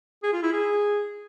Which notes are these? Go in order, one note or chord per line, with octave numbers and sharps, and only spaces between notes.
G#4
F4
E4
G#4